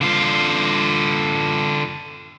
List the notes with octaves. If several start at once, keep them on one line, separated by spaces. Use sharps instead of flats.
D3 F4